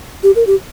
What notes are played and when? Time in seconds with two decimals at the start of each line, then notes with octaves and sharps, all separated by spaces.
0.23 G4
0.36 A#4
0.47 G4